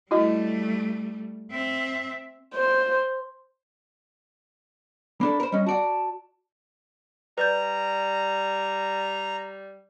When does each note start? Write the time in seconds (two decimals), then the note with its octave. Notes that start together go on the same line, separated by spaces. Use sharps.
0.11 G3 A3 E4 F#4 D#5
1.51 C4 E5
2.55 C5
5.21 A#3 D4 A4 B5
5.40 A#4 C5
5.52 G3 C#4 D#5
5.66 F#4 D5 F#5 A5
7.38 G3 B4 D5 A#5 G6